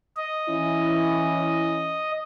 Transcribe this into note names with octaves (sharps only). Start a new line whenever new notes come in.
D#5
E3 C#4 E4